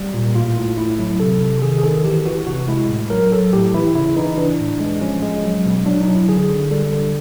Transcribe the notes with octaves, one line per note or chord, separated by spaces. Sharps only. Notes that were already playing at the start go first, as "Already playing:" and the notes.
Already playing: G3
A#2
A2 F4
A2
A2 E4
F#3 E4
C3 A4
C3
D#3 G#4
G#4
D#3 A4
E3 G4
E3 F#4
C3 F#4
G#3 E4
A2
F#3 A#4
F#3 A4
A2 G4
E3 E4
C#3 E4
E3 D#4
E3 D4
A2
G#3
F3 C#4
G#3
F#3
B2
F#3 D4
D#4
F#3
E4
D3 G#4
D3
G3 A4
D3